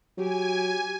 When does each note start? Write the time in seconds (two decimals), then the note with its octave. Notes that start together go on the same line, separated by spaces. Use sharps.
0.18 F#3 G4 G#5